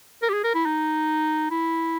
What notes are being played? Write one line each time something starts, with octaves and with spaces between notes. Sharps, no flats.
A#4
G4
G#4
A#4
E4
D#4
E4